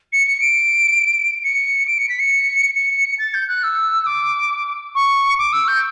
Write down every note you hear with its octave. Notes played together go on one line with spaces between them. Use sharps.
C#7
C#7
D7
C#7
D7
C#7
B6
C#7
C#7
A6
G6
F#6
E6
D6
C#6
D6
E6
G6